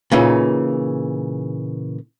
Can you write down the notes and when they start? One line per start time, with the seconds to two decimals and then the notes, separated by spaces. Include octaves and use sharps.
0.12 A#2 C#3 E3 D#4